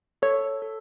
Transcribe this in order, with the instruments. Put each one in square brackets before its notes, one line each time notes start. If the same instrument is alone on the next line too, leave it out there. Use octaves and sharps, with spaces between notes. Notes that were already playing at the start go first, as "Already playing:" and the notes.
[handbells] A4 [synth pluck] C#5
[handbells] A4